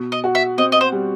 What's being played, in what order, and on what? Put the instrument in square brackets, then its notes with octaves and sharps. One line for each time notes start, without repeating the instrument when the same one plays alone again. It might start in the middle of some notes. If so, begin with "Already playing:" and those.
Already playing: [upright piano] B2
[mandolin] D#5
[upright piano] F#4
[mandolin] E5
[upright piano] C4 [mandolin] D#5
[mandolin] D#5
C5
[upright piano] G3